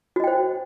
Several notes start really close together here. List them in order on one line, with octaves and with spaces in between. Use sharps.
F#4 D#5 G5 C5